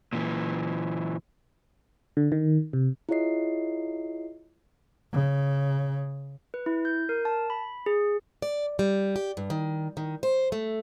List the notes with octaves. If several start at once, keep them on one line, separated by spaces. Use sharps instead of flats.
A#2 E3
D3
D#3
C3
E4 F4 G#4 C#5 D#5 C7
C#3
B4
E4
G6
A#4
A5
B5
G#4
D5
G3
G4
G2
D#3
D#3
C5
A3